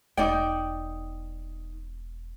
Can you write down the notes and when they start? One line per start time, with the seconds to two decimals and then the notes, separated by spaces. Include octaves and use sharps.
0.17 E1 D#4 D5 G5